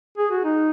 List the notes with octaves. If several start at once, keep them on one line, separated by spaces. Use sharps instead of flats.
G#4
F#4
D#4